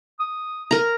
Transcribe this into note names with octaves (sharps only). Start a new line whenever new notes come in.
D#6
A#4 A#5